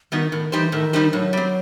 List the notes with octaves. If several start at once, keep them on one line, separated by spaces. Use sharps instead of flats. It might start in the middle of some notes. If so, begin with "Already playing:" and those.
D#3 G3 B3 D#4 F#4
A2 D#3
E3 G3 D#4 G4 C5
A2 D#3
G3 D#4 G4 C5
A2 F#3
G3 C4